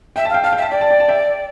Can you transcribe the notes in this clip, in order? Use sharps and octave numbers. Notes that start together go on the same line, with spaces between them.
E5 G5
F5 A5
G5
F5 A5
E5 G5
A5
D5 G5
A5
G5
A5
E5 G5